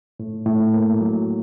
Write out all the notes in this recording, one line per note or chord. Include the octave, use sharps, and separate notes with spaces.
A2
A2
A#3
F#3